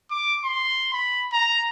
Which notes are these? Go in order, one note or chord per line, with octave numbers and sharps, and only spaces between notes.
D6
C6
B5
A#5